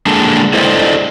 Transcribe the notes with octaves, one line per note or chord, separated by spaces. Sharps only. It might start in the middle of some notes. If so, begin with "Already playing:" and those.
D3 G#3 A#3 D4 G#4 A5
D4 E4 A4 C5 D5 D#5